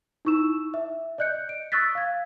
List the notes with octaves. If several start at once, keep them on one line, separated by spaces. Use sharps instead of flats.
D#4 E4 C#6 E6 E7
E5
D5 D#5 F#6 G6 C#7
D7
C#6 D#6 E6 F#6 A6 B6
F5 G#6